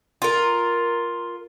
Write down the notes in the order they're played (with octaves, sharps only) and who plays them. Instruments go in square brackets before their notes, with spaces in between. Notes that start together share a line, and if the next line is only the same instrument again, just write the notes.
[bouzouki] F4 A#4